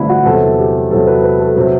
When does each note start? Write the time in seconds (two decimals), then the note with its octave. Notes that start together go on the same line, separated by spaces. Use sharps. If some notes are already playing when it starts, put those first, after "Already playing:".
Already playing: A1 G2 D3 C4 D4 E4
0.09 F#4
0.25 E2 C3 F#3 A4
0.59 G4
0.91 E2 C3 F#3 A4
1.07 B4
1.23 B4
1.40 A4
1.56 C3 F#3 G4